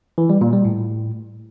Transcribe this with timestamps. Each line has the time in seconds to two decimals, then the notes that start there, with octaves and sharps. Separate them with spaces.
0.18 E3
0.30 G3
0.41 A#2
0.53 G3
0.65 A2